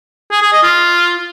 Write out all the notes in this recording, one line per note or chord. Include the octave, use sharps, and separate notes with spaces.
G#4
G#4
D#5
F4